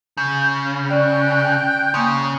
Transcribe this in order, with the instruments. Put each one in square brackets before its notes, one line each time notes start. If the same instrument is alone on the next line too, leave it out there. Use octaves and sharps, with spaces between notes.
[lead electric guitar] C#3 [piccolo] G6
[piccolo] F6
[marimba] C#4 D5 [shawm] G5 [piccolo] F#6
[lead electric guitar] C#3 [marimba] A#3 G#5 C6 [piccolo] D#6